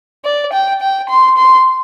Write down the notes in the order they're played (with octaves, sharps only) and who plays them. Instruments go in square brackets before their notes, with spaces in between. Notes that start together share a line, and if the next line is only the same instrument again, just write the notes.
[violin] D5
G5
G5
C6
C6